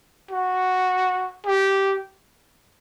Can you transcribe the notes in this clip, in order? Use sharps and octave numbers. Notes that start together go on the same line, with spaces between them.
F#4
G4